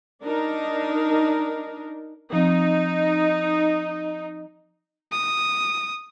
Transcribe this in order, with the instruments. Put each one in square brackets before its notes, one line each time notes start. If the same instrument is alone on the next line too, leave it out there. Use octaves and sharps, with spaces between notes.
[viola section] D4 D#4 A#4
[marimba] F3 C4 [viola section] D#4
[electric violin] D#6